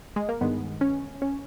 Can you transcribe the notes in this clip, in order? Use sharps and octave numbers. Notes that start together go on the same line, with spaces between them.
G#3
A#3
G2 D#3 G#3 B3
C#4
C#4